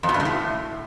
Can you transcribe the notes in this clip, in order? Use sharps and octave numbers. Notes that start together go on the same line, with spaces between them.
F2
B2
G2
C#3
A2